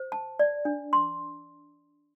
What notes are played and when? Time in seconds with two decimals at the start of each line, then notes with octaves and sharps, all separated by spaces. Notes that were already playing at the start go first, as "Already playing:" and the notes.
Already playing: C5
0.12 A5
0.39 D5
0.65 D4
0.93 C6